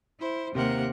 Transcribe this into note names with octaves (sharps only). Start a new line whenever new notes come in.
E4 C5
D#2 C3 A#3 A#4 C5 F#5